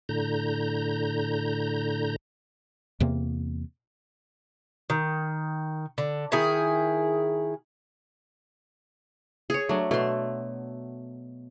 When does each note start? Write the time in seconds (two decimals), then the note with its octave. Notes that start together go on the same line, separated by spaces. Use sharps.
0.09 A2 D3 A#5 G6
3.00 E2 C3 A#3
4.90 D#3
5.98 D3
6.32 D#3 E4 G#4
9.50 G#4 C#5
9.69 F#3 A3 D4
9.91 B2 A3 C6